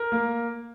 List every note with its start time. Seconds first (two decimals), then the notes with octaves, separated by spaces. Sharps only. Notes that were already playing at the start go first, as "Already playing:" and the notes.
Already playing: A#4
0.12 A#3